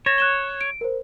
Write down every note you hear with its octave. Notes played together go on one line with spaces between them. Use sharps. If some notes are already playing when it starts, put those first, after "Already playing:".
C#5 A6 A#6 E7
F#6 E7 G7
D7
A#4 C5